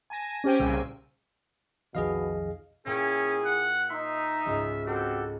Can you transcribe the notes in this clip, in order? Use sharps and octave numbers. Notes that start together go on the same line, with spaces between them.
G#5 A5 A#6
C#4 G4 C5 G5 G#5
C2 A#2 C#3 G#5 E6
B1 F2 B2 D#3 G#4 D#5 F5
A#2 C#4 E4 G#4 G5 D7
F#5
D#4 E5 C6 C7
C#2 G#2 F4
C4 F#4 G4 A4